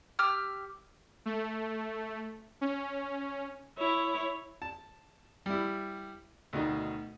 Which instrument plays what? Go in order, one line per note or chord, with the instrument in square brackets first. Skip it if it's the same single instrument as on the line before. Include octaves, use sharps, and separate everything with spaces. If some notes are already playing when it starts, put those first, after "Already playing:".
[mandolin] G4 E6 F6
[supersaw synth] A3
C#4
[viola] E4 C#5
[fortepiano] A5
G3 E4
D2 B2 D#3